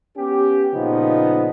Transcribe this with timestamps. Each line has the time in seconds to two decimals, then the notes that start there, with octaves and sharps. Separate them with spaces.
0.17 B3 C#4 G4
0.74 A#2 C#3 F3 B3 D#4